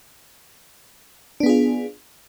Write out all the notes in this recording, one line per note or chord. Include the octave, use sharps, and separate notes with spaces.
B3 D4 F4 G#4